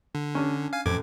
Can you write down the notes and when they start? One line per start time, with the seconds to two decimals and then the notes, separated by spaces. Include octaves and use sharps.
0.15 D3
0.35 C#4 D4
0.73 F5 G#5
0.86 A1 F2 D6 G#6